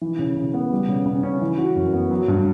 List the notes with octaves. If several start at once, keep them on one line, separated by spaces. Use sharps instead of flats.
E3
C#3
C#3
B3
G3
C#3
C#3
C#4
E3
F#4
F#2
B3
F#3
G2